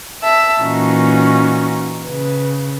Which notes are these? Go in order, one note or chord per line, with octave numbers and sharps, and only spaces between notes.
E5 A5
A#2 E3 A#3 C#4 D#4 F#4
C#3 B4